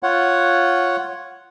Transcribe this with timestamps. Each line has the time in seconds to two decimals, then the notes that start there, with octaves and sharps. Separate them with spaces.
0.03 F4 C#5 F#5